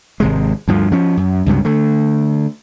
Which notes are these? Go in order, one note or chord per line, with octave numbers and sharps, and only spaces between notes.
G#1 C3 G#3
D2 G2 F3
F3 C#4
F#2
C#2 G2 C3 F#3
D3 A3